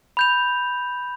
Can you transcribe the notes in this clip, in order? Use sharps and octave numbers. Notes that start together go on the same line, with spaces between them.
B5 G6 F7